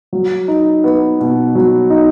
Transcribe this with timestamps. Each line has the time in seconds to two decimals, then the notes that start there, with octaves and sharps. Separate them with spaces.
0.13 F#3
0.48 D#4
0.84 B3
1.20 B2
1.55 F#3
1.90 D#4